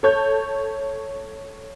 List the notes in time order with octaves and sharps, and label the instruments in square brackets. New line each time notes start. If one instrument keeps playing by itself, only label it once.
[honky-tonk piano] A4 C#5 G6